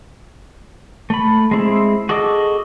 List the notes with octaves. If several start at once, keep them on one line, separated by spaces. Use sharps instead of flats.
A3 B5
G#3 C4 E4
F#4 G#4 A4 D#5 D6